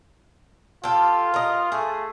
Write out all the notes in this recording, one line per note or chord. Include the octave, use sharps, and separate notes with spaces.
F4 G4 A4
A#4 D#5
A3 G#4